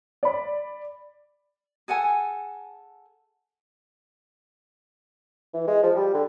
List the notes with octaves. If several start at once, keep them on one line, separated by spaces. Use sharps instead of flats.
D5 B5
G#4 A4 F#5 G#5
E3
G#3
F3
G3
D3